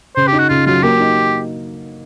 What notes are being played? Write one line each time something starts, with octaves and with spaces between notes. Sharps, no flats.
C#3 C5
G4
D#4
F#4
C#3 F4
F#3 F4
A#3 G4
D#4